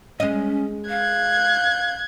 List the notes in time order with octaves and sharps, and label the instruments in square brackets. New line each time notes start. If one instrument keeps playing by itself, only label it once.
[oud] G#3 D#5 [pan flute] C#4
[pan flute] F5 [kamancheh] F#6 [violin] G#6